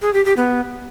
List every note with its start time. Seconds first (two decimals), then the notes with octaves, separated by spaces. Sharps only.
0.02 G#4
0.13 G4
0.25 G4
0.37 B3